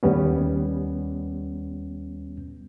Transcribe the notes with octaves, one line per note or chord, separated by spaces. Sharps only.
D#2 G3 B3 C#4